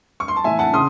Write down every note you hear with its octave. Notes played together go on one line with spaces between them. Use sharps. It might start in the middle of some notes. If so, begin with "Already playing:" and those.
C#6
C6
A5
A2 E3 E5 G#5
F#5 A5
C#3 C6 D#6